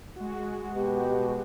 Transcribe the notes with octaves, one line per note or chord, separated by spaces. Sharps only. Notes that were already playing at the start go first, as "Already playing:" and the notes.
G#3 F#4
B2 G4